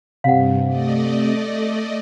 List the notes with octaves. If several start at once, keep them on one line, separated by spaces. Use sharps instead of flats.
G2 C3 F5 F#5
A3 D5 D#5